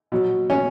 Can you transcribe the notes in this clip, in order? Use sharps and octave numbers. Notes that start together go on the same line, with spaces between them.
B2 F#3
C#4